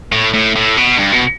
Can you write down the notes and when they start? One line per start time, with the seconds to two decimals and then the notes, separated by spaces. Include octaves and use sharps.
0.12 A2
0.34 A2
0.56 A2
0.77 B2
0.98 G2
1.13 B2